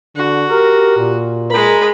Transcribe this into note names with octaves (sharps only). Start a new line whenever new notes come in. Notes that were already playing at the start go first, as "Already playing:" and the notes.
D3 F#4
G4 A#4
A#2
G#3 A#4 B5